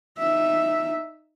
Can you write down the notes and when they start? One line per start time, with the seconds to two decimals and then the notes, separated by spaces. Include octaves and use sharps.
0.19 D#4 E5